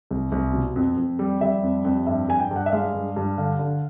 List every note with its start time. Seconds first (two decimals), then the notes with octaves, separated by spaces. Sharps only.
0.11 C2
0.32 C2
0.53 B2
0.76 F2
0.97 F2
1.19 G3
1.41 G3 E5
1.63 F2
1.84 F2
2.07 G2 E5
2.29 G2 G#5
2.40 G5
2.51 G2
2.56 F#5
2.66 E5
2.72 G#3 F5
2.94 G2
3.16 G2
3.38 D3 F5
3.59 D3